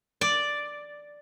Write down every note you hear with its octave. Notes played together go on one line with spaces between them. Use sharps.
D5